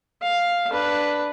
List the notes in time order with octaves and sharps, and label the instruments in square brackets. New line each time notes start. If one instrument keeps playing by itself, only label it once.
[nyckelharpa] F5
D4 B4